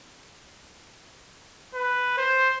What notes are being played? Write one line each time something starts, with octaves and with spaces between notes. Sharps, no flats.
B4
C5